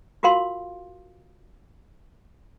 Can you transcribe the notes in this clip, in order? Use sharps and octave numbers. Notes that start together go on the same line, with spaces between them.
F4 F#4 A#4 F5 C6